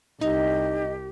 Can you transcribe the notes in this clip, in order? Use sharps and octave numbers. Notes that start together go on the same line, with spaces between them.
C2 D#4 G4 D#5